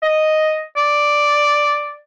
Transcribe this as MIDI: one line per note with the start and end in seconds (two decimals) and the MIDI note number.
0.03 0.63 75
0.77 1.96 74